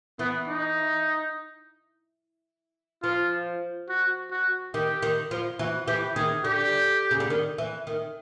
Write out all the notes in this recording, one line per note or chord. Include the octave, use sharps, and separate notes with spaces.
E3 B3
D#4
F3 F4
F#4
F#4
D#3 G4
D#3
F3
E3 F#4
E3 G4
D#3 G#4
D3 G4
C#3
D3
D#3
E3
D#3